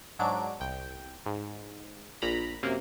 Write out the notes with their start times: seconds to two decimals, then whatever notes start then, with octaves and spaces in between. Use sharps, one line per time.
0.19 G#2 F#3 D4 D7
0.60 C2 G5
1.26 G#2
2.22 A#1 A#2 A#5 B5
2.63 F#2 C3 A#3